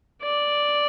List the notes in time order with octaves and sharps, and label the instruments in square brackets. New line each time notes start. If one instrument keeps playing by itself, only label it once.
[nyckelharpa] D5